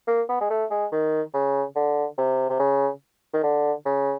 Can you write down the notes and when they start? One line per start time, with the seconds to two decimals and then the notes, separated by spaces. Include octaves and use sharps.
0.07 A#3
0.29 B3
0.41 G#3
0.50 A3
0.71 G#3
0.92 D#3
1.34 C#3
1.76 D3
2.18 C3
2.50 C3
2.59 C#3
3.34 D#3
3.43 D3
3.86 C#3